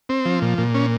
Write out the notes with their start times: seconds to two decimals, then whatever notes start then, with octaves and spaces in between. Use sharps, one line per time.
0.09 C4
0.25 F3
0.42 A#2
0.58 A#2
0.75 C#4